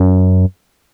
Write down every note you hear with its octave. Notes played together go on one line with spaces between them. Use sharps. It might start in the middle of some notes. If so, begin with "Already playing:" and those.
Already playing: F#2